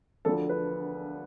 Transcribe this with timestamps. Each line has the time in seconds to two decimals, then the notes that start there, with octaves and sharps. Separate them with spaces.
0.25 E1 D2 D3 F3 A4
0.49 B4